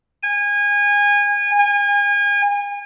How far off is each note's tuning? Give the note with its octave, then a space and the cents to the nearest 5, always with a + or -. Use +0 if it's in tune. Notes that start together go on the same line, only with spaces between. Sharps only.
G#5 -25
G#5 -35